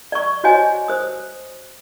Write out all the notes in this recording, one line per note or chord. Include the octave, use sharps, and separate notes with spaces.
D5 C#6
F#4 C5 C#5 D#5 G#5
C5 D#6